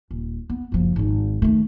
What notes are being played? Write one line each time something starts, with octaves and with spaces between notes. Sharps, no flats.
D#1
B3
F#1 F3
G#1 D#3
D#3 A3